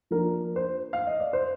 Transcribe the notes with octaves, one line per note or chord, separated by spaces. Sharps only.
F3 A#3 D4 A#4
C5
F5
D#5
D5
C5